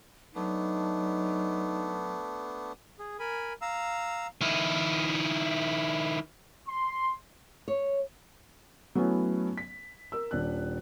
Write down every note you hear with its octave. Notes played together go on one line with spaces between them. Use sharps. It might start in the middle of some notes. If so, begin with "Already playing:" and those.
F#3 A3 B3 D4 D#4
G#4
A#4 G#5 B5
F5 A#5 E6
D#3 E4
C6
C#5
F#3 A3 B3 C#4 E4
B6
A#4 E6
D#1 D4 F#6